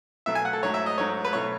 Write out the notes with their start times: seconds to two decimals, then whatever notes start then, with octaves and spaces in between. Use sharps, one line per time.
0.26 B2 F#3 A3 E5
0.35 G#5
0.45 F#5
0.53 A4
0.63 G#2 F#3 A3 C#5
0.74 E5
0.86 D#5
0.98 G#2 F#3 A3 C#5
1.25 B4
1.33 B2 F#3 A3 C#5